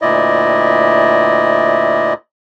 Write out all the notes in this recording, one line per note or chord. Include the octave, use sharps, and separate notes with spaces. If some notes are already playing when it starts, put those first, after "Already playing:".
D2 A#2 E4 D5 D#5